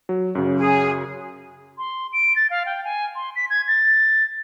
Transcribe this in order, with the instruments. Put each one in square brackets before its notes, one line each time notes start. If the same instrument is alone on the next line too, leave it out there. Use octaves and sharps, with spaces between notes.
[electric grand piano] F#3
F#2 C#3
[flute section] G#4
[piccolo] C6
D7
A6
F5
G5
G#5
C6
B6
G#6
A6